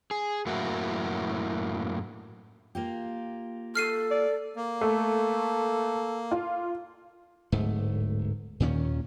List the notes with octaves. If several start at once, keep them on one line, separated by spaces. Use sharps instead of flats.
G#4
F#2 A2 A#3 E4 F#4
A#3 F4 G4
A4 F6 C7 D#7
D5
A#3
A3 A4
F4
D1 G#2 A3
D#2 A#2 D#3 C#4